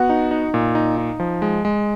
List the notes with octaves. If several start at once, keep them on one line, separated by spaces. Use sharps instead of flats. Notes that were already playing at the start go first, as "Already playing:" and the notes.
Already playing: B3 F#4 F#5
D#4
D#4
A#2
D#4
D#4
F3
G#3
G#3